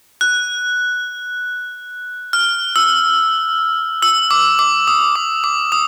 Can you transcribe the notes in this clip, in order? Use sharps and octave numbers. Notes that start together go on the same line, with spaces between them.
F#6
F6
E6
E6
D6
D6
D#6
D6
D6
D#6